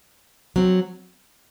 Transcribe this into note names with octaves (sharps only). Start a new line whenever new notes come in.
F#3 C4